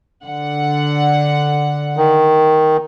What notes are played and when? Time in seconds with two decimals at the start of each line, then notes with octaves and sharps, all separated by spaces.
0.24 D3 F#5
1.97 D#3